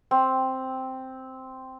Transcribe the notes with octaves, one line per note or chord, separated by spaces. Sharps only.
C4 G5